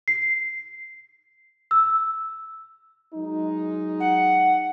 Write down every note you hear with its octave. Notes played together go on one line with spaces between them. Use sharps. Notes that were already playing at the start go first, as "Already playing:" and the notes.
C7
E6
F#3 G#3 D#4
F#5